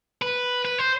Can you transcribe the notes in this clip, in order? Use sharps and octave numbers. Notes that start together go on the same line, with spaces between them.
B4
B4
C5